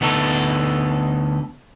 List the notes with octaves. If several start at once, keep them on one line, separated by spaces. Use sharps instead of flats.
D2 B3 D#4 A4